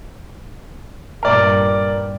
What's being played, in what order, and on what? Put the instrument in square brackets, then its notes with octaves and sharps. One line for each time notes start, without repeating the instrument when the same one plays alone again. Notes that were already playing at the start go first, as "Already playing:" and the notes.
[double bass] G2 A#2 [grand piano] A#4 D5